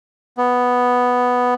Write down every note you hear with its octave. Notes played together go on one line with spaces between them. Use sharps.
B3